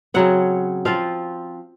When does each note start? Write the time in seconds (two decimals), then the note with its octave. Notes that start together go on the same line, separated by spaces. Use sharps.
0.14 C#3 F#3 C4 F#5
0.85 F3 C4 F4 F5